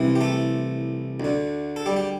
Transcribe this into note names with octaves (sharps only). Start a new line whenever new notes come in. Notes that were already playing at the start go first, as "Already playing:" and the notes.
Already playing: C2 C3 E3
G4
A3 A4
D2 D3
A4
G3 G4
G4